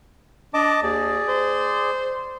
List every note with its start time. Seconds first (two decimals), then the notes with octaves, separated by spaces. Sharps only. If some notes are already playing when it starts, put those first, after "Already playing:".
0.54 D4 D#5 A5 D6
0.83 D#2 G#4 D5
1.28 C5